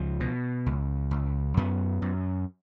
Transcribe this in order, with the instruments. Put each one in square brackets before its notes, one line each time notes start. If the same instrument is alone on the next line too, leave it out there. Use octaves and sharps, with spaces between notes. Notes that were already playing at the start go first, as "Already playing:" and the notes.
Already playing: [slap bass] C#2 F3
B2
C#2
C#2
F#2 B3
F#2